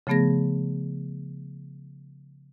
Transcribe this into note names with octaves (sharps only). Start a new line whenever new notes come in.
C#3 F3 A3 B3 G#4 A#6